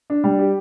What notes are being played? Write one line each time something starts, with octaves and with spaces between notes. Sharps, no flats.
D4
G3
G4